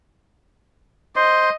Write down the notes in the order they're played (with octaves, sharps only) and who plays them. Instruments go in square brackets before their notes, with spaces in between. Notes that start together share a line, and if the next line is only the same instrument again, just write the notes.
[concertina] C5 C6 [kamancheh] D#5